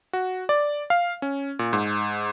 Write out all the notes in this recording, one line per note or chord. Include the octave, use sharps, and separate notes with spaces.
F#4
D5
F5
C#4
A#2
G#2